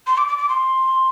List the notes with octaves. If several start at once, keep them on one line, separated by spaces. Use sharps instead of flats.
C6
D6
D6
D6
C6